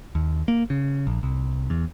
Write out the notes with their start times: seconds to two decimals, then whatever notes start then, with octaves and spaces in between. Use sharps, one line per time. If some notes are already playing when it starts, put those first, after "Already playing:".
0.15 D#2
0.48 A#3
0.70 C#3
1.07 A#1
1.23 C2
1.70 E2